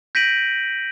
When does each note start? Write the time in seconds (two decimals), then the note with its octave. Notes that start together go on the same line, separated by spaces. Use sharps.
0.15 G6 A#6 B6 D7 D#7 F#7